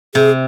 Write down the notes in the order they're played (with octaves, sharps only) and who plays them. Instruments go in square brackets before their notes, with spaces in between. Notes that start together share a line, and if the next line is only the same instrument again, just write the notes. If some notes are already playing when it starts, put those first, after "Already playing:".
[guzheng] C3 [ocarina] G#4